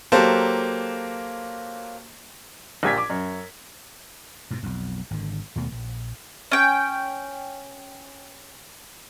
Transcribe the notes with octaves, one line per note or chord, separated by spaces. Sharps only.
F#3 A#3 G4 A4 C5
A#1 A#2 G4 G#6 B6
D6
F#2
G#2 B2
B1 F2
G#1 D3
D#2 B2 A3
A#1
C#4 G5